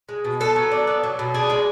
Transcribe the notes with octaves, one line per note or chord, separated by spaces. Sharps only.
G#3
B2
B3 A4
F#3
D4
B3
F#3
B2
D4 G#4
G#3